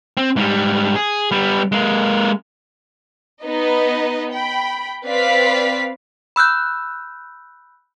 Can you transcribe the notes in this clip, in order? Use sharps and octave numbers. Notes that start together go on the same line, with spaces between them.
C4
G#2 G3
G#4
G3 B3
G#3 A#3
B3 D#4 B4 D#5
G5 B5
C4 B4 D5 F5 B6
B5 E6 F#6 G6